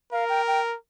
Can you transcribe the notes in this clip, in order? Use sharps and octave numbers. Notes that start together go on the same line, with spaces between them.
A#4 F5
G5
G5